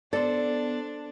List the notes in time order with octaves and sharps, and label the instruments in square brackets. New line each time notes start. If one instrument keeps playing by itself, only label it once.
[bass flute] B3 [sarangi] D4 [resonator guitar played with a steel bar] A4 C5 [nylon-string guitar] D5